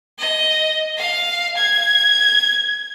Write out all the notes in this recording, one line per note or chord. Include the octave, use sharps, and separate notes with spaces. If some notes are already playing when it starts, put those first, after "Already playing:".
D#5
F5
G#6